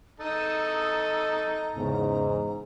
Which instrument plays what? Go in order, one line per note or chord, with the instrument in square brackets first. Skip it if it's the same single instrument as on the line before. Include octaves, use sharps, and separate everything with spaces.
[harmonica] D#4 A4 [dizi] A#5 [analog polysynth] D#6 E6
[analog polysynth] E2 C#3 [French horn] G#2